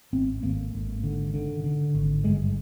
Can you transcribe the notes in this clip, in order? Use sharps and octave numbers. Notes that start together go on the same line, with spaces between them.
G#1 C4
G#1 A#3
G#1
D3
D3
D3
G#1
G2 G#3